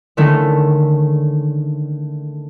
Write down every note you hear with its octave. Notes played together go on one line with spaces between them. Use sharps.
D3 D#3 G#3 A3 C#4 A4